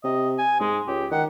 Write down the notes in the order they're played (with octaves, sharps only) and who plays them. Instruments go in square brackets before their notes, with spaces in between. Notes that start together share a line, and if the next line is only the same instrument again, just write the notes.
[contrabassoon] C3 [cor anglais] D#5
[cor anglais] G#5
[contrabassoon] G#2 [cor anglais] G#3
[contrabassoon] C#2 [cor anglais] G4
[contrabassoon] D#3 [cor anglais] F#5